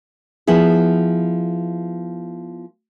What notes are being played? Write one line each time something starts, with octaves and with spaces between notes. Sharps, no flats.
F3 B3 E4 G#4